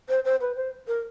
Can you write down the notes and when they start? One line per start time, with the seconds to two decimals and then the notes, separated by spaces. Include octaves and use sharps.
0.09 C5
0.25 C5
0.41 B4
0.56 C5
0.87 A#4